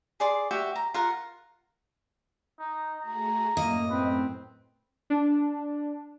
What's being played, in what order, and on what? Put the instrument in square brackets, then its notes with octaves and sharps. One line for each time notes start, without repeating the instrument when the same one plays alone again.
[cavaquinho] G#4 D5 C6
F#4 G4 E5 G5
A#5
F4 A#4 F#5
[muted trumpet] D#4
[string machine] A3 F#4 G#4 [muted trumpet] A#5
[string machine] F#2 A2 [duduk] A#3 [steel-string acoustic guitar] D#5
[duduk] C4 [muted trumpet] B4
[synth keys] D4